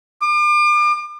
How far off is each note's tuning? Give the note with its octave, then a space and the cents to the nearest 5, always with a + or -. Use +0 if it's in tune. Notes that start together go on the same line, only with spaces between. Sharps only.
D6 +40